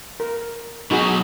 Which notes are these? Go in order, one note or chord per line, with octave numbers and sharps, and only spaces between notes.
A#4
B2 F#3 D#4 F#4 G#4